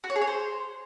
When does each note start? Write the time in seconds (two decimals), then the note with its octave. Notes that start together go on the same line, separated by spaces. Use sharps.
0.04 F#4
0.10 C#5
0.16 G#4
0.21 C#5
0.27 C5